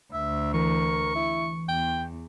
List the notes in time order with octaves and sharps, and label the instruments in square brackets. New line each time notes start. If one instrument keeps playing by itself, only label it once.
[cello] D2 [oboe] E5
[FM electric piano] E3 [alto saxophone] A#4 [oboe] C#6
[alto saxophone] E4
[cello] E2 [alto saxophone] G5